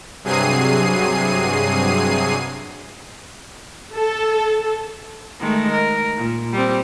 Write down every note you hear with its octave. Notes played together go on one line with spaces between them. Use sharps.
G2 C3 F#3 G#4 C7 D#7
A4
D#3 G#3 A3
A#4
A#2
G3 C4